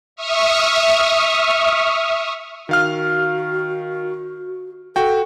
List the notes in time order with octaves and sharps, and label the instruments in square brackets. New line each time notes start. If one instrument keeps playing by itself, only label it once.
[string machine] E5 C#6 D#6 F6
[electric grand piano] D#3 F5 F6 [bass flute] F#4
[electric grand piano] F#4 G5 [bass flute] A4